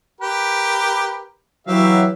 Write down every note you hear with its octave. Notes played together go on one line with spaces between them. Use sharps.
G4 A#4 B4
E3 F#3 G4 E5 F5